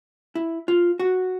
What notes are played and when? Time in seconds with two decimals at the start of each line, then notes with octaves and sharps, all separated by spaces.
0.35 E4
0.68 F4
0.99 F#4